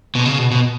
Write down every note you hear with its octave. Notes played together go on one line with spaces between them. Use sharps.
B2
C#3
B2
B2